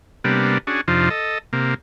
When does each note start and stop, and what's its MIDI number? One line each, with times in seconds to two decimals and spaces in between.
0.24 0.58 48
0.24 0.58 55
0.24 0.58 58
0.24 0.58 59
0.24 0.58 62
0.67 0.81 61
0.67 0.81 62
0.67 0.81 66
0.67 0.81 68
0.88 1.09 41
0.88 1.09 48
0.88 1.09 53
0.88 1.09 62
0.88 1.09 63
0.88 1.09 65
1.10 1.38 69
1.10 1.38 75
1.53 1.74 48
1.53 1.74 58